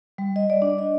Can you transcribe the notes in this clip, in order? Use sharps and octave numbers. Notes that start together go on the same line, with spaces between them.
G3
D#5
D5
D4
D#5